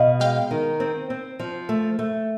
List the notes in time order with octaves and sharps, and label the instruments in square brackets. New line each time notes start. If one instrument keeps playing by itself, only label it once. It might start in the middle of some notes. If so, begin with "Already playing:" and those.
Already playing: [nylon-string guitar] B2 [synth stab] D#5 F5
[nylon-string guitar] G#3 [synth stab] F5 G5
[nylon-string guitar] D#3
C4
C4
F3
A3
A3